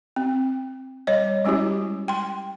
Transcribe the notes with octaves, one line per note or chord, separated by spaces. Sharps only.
C4
G3 C#5 D#5
G3 G#3 C#4 E4 F#4 G4
G5 C6